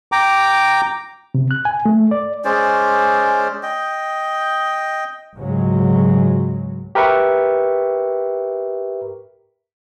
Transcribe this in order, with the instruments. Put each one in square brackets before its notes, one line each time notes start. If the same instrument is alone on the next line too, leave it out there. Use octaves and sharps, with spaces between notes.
[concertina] G5 A#5 D6
[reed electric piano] C3
F#6
G#5
A3
D5
[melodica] G#3 C#4 C5 D5
D#5 G5
[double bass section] C#2 G#2 C#3 F#3 G#3
[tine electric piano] G4 A#4 B4 E5 C#6